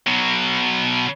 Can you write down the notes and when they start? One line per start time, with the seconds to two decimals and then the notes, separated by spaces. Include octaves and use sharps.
0.07 B2 F#3